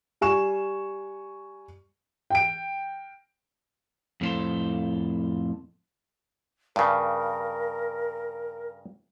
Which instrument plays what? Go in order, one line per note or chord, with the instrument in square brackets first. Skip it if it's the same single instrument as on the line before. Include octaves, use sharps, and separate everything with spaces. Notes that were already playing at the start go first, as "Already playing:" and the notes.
[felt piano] G3 G#5 C#6 E7
[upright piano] G5 D7
[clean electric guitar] F2 A2 C#4 A4 C5
[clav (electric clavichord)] G2 C#3 [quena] A#4